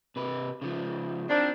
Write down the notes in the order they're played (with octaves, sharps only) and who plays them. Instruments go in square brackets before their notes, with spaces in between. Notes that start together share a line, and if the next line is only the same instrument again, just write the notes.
[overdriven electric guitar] C3 B4
C#3 F3
[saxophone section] D#3 F3 D4 [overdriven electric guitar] C4